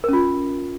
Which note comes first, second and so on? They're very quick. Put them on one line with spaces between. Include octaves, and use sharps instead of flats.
A#4 C#4 F4